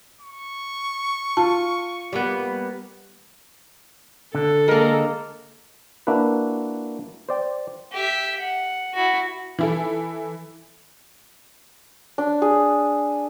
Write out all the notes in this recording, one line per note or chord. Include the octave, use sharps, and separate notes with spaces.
C#6
F4 A5
G3 A#3 B3
D3 A4
G#3 A#3 A#4
A#3 D4 E4 F#4 B4
C5 D5 G5
G4 E5
F#5
E4 F#4
E3 E4 A4
D4
G#4